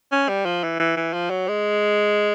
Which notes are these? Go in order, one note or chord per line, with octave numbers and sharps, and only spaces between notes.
C#4
G3
F3
E3
E3
E3
F3
F#3
G#3